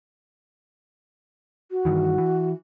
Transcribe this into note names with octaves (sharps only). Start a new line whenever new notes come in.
F#4
G2 D#3 E3
E3